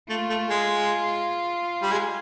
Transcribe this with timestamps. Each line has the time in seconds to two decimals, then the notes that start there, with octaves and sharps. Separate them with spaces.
0.09 A3 F4
0.30 A3
0.50 G#3
1.82 G3
1.92 G#3